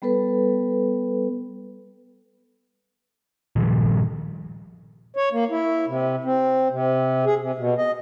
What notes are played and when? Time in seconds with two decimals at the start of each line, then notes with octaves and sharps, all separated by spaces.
0.02 G3 B3 A4 B4
3.56 A#2 D#3 F3 G3
5.16 C#5
5.32 A#3
5.50 E4
5.88 C3
6.24 C4
6.71 C3
7.25 G#4
7.39 C3
7.58 B2
7.78 D#5